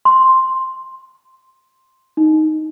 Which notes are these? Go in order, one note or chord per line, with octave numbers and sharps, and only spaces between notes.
C6
D#4